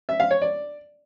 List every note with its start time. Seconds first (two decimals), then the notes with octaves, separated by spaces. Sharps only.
0.09 E5
0.20 F5
0.31 C#5
0.42 D5